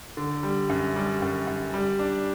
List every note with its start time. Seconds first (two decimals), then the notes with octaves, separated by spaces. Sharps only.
0.17 D3
0.43 G3
0.70 F#2
0.96 G3
1.22 F#2
1.47 F#2
1.74 G3
1.99 D4